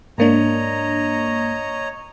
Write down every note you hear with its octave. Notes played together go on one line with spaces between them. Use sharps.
G#2 A#3 D4 C#5 D#5 A#5